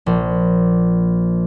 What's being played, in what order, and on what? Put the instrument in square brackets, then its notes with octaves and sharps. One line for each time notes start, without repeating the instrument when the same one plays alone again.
[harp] A#1